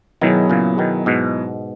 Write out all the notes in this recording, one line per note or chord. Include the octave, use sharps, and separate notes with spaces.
B2 D#3 F#3 B3 E4 G#4
A#2 C#3
B2 D#3
G#2 B2